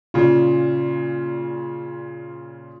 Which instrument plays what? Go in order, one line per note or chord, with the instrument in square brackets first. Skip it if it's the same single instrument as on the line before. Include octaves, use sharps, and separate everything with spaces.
[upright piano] A#2 C#3 [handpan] F4 D5